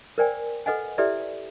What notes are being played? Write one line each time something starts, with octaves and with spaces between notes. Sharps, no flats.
A#4 C5 D5 G5 G#5
A4 B4 D#5 F#5 G#5
E4 G4 A4 B4 D5 E5